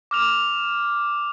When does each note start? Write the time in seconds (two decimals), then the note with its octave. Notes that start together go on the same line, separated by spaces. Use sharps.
0.11 D6 F6 F7